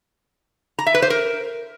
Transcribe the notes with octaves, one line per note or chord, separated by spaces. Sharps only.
A#5
E5
B4
C5
A#4